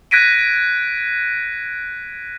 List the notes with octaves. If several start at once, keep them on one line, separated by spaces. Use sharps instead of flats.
F#6 G#6 A#6 B6 D7 D#7